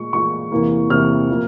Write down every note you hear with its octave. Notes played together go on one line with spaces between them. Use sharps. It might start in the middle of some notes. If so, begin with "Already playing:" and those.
Already playing: A#2 G#3 C#6
A#2 G#3 C#6
E2 C3 E3 A#3
E2 C3 E3 A#3 F6
A#2 F3 A#3